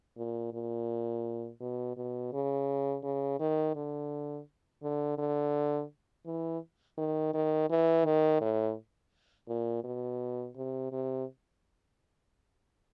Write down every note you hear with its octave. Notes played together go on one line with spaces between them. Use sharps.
A#2
A#2
B2
B2
C#3
C#3
D#3
D3
D3
D3
E3
D#3
D#3
E3
D#3
A2
A#2
B2
C3
C3